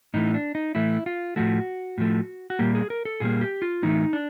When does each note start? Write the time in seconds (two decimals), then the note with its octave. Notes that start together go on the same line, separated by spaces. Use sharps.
0.14 A2 E3 A3 D#4
0.34 D4
0.55 D#4
0.75 A2 E3 A3 E4
1.06 F4
1.36 A2 F3 A3 F#4
1.98 A2 F3 A3
2.50 F#4
2.59 A#2 G3 A#3 G4
2.75 G#4
2.90 A#4
3.05 A4
3.20 A#2 G3 A#3 G#4
3.41 G4
3.62 F4
3.82 A2 E3 A3 D#4
4.13 D4